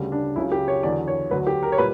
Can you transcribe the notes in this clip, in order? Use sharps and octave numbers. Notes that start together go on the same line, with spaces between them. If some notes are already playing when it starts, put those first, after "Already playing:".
Already playing: D2 C#3 G3
D4
C#2 C#3 F#3 E4
G4
C#5
E2 D3 F#3 D5
C#5
D2 D3 F#3 B4
G4
A#4
C#5
A#2 G3 B4